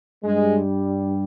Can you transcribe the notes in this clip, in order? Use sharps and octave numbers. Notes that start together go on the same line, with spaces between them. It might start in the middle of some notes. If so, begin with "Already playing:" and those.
G2 G3 G#3